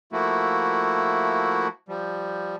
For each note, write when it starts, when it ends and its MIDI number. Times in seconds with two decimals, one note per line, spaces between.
0.13 1.68 53
0.13 1.68 57
0.13 1.68 58
0.13 1.68 64
0.13 1.68 66
1.89 2.56 53
1.89 2.56 55